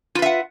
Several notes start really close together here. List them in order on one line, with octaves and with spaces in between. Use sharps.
F4 B4 E5 F#5